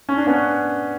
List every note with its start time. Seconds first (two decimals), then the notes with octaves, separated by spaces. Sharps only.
0.09 C#4
0.17 D4
0.27 B3 C#4